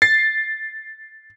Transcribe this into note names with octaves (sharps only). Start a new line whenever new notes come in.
A6 C7